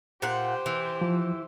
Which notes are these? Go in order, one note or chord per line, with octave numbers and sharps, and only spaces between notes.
A#2 G4 C5 F#5
E3
F3